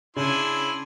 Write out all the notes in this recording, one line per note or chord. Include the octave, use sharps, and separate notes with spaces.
C#3 C#4 D4 E4 G#5 C6